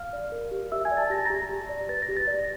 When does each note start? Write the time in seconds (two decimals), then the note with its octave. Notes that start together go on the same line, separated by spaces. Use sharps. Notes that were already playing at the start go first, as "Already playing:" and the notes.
Already playing: F5 F6
0.13 D5
0.32 A#4
0.51 G4
0.72 G4 E5 E6
0.85 G#5 G#6
0.91 D5
0.97 A5 A6
1.10 G4 A#6
1.18 A6
1.26 G4 A#5 A#6
1.49 G4
1.69 D5
1.89 B4 A6
2.02 A#6
2.09 G4
2.17 A6
2.27 D5 A#6